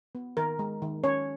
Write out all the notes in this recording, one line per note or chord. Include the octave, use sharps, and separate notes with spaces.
B3
D#3 A#4
G#3
D#3
C#4 C#5